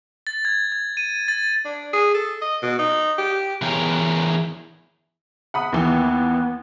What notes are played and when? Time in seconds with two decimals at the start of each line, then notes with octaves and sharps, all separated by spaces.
0.27 A6
0.45 G#6
0.72 G#6
0.97 D#7
1.28 A6
1.65 D4
1.93 G#4
2.14 A4
2.41 D#5
2.62 B2
2.79 D#4
3.18 G4
3.62 E3 B3 G#4 A#4 C#5 G5
5.54 F#5 B5 D#6
5.73 D#2 E3 B3